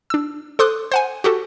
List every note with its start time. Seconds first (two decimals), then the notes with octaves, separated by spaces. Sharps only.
0.10 D4 E6
0.59 A4 C5 C6 D6 D#6 F#6
0.92 C5 F#5 G#5
1.24 F#4 G4 A4